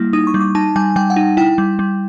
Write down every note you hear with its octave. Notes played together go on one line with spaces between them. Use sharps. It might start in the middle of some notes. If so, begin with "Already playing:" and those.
Already playing: G3 A#3 E4
D#4 D#6
C#6
G3
D6
D#4 A5
G3 G#5
G3 G5
F#5
D#4
E4 G5
G3
G3